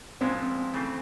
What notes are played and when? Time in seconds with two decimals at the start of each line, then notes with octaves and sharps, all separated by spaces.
0.21 A#2 F3 G#3 B3 C4 E4
0.74 C#3 E3 A3 C4